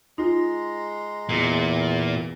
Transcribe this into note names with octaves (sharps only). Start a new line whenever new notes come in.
G#3 D#4 F4 A#5 C6
E2 A#2